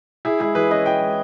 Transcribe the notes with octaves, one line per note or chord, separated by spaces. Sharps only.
E4 G#4
G#3 E4 G#4
E3 G#4 B4
C#4 B4 D#5
E4 D#5 G5
G#3